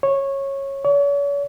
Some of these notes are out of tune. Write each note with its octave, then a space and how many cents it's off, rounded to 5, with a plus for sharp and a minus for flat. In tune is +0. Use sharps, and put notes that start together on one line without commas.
C#5 -15
C#5 +40